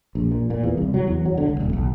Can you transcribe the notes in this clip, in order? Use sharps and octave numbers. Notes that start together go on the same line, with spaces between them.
A#1
A#2
A#2
E2
C2
F#3
E2
F#3
D3
C#2
D#1
B1